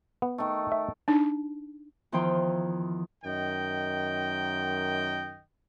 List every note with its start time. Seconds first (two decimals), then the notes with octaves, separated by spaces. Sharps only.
0.22 B3
0.38 D#3 A3
0.72 E5
1.08 D4 D#4
2.12 E2 D#3 F3 E4 C5 G5
3.24 F#2 D#3 D#5 G5